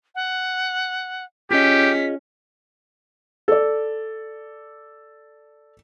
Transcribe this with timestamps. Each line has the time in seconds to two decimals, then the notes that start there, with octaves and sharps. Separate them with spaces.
0.15 F#5
1.51 C#4 F4 G4 G#4 D#5 B6
3.48 A4 D5